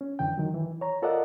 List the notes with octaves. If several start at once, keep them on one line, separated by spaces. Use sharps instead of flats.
C#4
F#2 D3 E3 G5
D#3 F#3
E3
C#5 A#5
F4 A4 A#4 D5 D#5 F#5